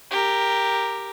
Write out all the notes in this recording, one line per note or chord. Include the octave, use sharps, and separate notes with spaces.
G4 A#4